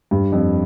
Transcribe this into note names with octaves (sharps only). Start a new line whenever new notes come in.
G2
F2